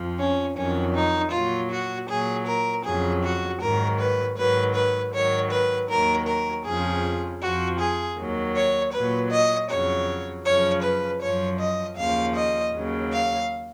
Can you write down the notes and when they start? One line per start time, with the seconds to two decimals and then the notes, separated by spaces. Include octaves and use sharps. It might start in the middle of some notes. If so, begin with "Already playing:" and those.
Already playing: F2 F3
0.19 C#4
0.57 F2 D#3 F#3 C#4
0.95 D#4
1.33 A#2 F#3 F4
1.71 F#4
2.09 A#2 F#3 G#4
2.48 A#4
2.86 F2 C#3 F#3 G#4
3.24 F#4
3.62 G#2 D#3 F#3 A#4
3.99 B4
4.37 G#2 D#3 F#3 B4
4.76 B4
5.14 G#2 D#3 F#3 C#5
5.52 B4
5.90 D#2 D#3 F#3 A#4
6.28 A#4
6.66 F2 C#3 F3 G#4
7.42 F2 F3 F#4
7.80 G#4
8.18 D#2 D#3 F#3
8.56 C#5
8.94 A#2 F#3 B4
9.32 D#5
9.70 F2 C#3 F#3 C#5
10.46 F#2 C#3 F3 C#5
10.84 B4
11.23 F#2 F3 C#5
11.60 D#5
11.98 D#2 C#3 F3 F5
12.37 D#5
12.74 D#2 C#3 F#3
13.13 F5